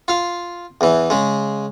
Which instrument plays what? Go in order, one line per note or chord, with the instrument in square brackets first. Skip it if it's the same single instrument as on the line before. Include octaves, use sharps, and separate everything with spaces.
[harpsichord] F4 F5
E2 E3
C#3 G#3